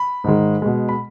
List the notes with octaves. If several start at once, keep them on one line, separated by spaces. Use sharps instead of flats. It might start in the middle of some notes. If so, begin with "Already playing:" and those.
Already playing: B5
G#2 D#3 G#3
B2 G#3
B5